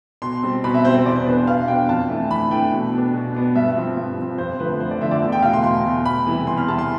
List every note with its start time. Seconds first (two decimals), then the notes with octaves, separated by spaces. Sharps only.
0.22 B2 C6
0.43 G3 C4
0.64 B2 B5
0.74 E5
0.85 G3 C4 C5
0.95 C5
1.05 E2 D5
1.16 C5
1.26 B2 B3 D4 B4
1.37 B4
1.47 E2 F5
1.68 B2 B3 D4 G5
1.89 F2 A5
2.09 E3 A3 D4
2.30 F2 B5
2.51 E3 A3 D4 G5
2.72 B2
2.93 B3 D4
3.13 B2
3.35 B3 D4
3.55 G2 E5
3.76 F3 C4
3.97 G2
4.18 F3 C4
4.38 F2 C5
4.60 D3 F3 A3 B4
4.80 F2 C5
4.91 D5
5.01 D3 F3 A3 E5
5.11 D5
5.22 E2
5.32 G5
5.42 B2 A3 F5
5.53 C6
5.64 E2 C6
5.85 B2 A3
6.05 E2 B5
6.27 C3 E3 G3
6.47 E2 C6
6.58 F6
6.68 C3 E3 G3 A5
6.78 C6